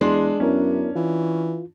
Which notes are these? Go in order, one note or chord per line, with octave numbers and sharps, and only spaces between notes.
E2 G#3 D4 C6
F#2 B3 C#4 E4 A#4
E3 F4